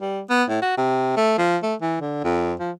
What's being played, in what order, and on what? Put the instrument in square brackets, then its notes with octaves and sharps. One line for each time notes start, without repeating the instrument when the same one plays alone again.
[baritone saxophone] G3
B3
A2
F#4
C3
A3
F3
A3
E3
D3
F2
F3